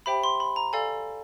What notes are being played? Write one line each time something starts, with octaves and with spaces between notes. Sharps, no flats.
G4 C5 E5 G5 B5
C6
B5
A#5
A4 D5 F5 G#5